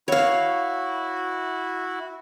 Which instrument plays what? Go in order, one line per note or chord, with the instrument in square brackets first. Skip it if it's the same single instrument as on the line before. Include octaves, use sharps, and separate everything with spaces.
[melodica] E4 F#4 [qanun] C#5 F5